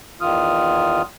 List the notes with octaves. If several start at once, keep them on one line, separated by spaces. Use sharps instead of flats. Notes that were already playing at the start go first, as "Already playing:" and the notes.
E2 D#3 F4 D#6 F6